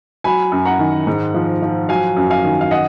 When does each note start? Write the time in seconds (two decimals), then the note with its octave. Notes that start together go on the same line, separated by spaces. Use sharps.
0.24 F#3 G#5 B5
0.52 F#2
0.65 F#5 A#5
0.79 D#3
1.07 G#2
1.34 F3
1.62 F3
1.89 F#3 F5 G#5
2.16 F#2
2.30 F5 G#5
2.44 D#3
2.61 F5
2.71 D#5 F#5